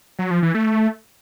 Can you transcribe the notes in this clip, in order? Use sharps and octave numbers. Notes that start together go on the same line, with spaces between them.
F#3
F3
E3
A3